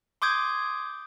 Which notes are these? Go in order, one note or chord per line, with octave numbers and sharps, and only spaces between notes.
C6 D6 D#6 G6 G#6